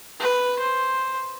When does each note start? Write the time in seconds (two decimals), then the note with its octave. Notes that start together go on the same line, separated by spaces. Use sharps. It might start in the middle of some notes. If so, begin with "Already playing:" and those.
0.20 B4
0.59 C5